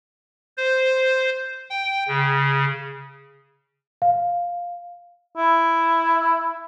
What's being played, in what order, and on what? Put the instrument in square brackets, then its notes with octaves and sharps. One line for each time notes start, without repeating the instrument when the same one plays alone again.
[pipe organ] C5
G5
C#3
[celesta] F5
[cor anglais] E4